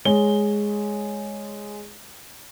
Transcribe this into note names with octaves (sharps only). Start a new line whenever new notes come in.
G#3 C#5 G7